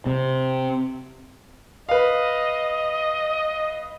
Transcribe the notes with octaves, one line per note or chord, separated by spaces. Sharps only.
C3
B4 D#5 F5